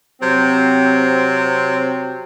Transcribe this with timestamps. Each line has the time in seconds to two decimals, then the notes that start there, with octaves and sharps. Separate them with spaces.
0.21 C3 F#3 C4